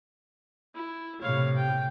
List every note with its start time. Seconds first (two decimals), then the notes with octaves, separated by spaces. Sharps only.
0.75 E4
1.21 A2 C3 C#5 F5
1.56 G5